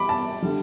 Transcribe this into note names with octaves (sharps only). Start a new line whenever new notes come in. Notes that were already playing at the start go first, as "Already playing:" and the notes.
Already playing: G3 B5 D6
A5
D3 G3